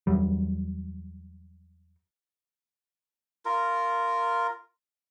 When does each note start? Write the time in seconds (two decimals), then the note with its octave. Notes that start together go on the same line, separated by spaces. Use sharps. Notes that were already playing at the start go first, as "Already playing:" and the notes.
0.07 E2 F#3 G3
3.45 F4 A#4